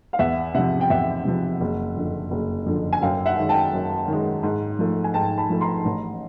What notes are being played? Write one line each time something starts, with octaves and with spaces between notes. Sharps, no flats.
F5
E2 E5 F#5
C3 F3 E5 F#5
G5
E2 E5 F#5
C3 F3
F#1
F2 D3
F#1
F2 D3
G#5
F#2 F5 G5
E5 F#5
D#3 G#3
G5 A5
F#2
D#3 G#3
G#2
F3 A3
G#5
G#2 G5 A5
A5 B5
F3 A3
A#5 C6
A1